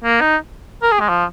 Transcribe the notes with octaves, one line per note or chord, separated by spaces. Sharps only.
A#3
D#4
A#4
G#4
G#3
F3